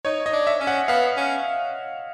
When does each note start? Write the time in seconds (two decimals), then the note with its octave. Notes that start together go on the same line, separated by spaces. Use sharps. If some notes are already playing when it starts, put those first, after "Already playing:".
0.05 D#4 C#5
0.26 D#5
0.33 D4
0.47 E5
0.60 C#4
0.67 F#5
0.88 B3 F5
1.17 C#4